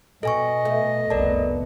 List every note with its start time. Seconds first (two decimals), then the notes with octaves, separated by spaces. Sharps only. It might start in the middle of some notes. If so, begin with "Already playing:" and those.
0.23 B2 G3 A4 D#5 G#5 C#6
0.65 A3
1.10 F1 C2 B3 A#4 D5 A5